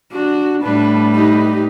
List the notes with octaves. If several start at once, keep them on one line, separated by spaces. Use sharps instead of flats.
D4 F#4
A2 G3 D4 B4
D#4 G4